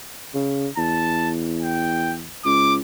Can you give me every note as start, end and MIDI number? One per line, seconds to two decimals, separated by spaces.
0.34 0.68 49
0.77 2.34 40
0.77 1.31 81
1.62 2.14 79
2.45 2.79 37
2.45 2.75 86